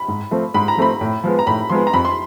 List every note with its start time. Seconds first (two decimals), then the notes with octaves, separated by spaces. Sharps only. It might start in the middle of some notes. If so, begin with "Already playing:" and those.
Already playing: B5
0.08 G#2
0.31 F3 A3 C4
0.54 G#2 B5
0.68 A#5
0.77 F3 A3 C4 B5
1.01 A2
1.24 F3 G#3 B3
1.39 A#5
1.47 A2 B5
1.69 F3 G#3 B3 C6
1.87 A#5
1.93 F2 B5
2.05 C6